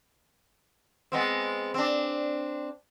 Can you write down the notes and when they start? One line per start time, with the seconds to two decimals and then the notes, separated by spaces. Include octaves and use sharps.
1.12 G#3 B3 C4
1.74 C4 D4